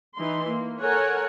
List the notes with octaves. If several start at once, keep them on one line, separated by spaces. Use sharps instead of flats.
E3 D#4 C6
A#3
A4 A#4 C#5 F#5 G#5